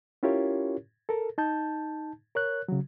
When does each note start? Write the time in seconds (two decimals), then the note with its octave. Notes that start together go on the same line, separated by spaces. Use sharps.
0.23 C#4 E4 F4 G4 A#4 C#5
1.09 A4 A#4
1.38 D#4 A5 G6
2.35 A#4 C#5 F#6
2.68 C#3 F#3